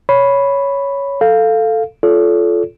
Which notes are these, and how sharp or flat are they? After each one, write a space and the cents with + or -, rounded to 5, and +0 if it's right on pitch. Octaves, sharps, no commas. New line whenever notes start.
C#5 +5 B5 +0
A4 +5 F5 +0
F4 -5 A4 -25 C#5 +45